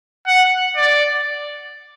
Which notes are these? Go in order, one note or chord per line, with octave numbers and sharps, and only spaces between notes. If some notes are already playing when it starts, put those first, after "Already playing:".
F#5
D5